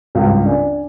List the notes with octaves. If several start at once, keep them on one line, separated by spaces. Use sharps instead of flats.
G#1 C#2 G2
D4 D5 G#5